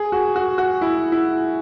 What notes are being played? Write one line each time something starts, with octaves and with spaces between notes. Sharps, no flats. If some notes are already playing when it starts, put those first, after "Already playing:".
Already playing: G#4
F#4
F#4
F#4
E4
E4